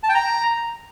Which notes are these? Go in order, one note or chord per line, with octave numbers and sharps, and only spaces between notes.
A5
G5
A#5